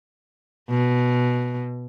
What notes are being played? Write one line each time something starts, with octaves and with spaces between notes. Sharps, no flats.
B2